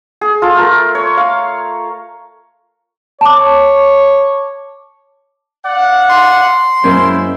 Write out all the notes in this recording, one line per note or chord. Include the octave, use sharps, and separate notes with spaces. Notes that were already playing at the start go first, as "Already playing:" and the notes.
G#4
F4 A4
A3 F4 A#4
C#5
F5
C#5 A5 D6
D5 F5 F#5
C6
F#2 G#3 A#3 E4 C5